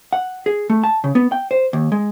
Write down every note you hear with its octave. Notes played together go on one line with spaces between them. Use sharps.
F#5
G#4
A3
A5
C#3
B3
G5
C5
D#2
G#3